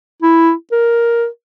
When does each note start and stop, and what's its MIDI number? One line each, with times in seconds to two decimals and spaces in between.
0.22 0.52 64
0.72 1.27 70